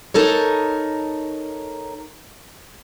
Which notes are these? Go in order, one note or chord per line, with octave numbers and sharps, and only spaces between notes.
D#4 A4 A#4 C#5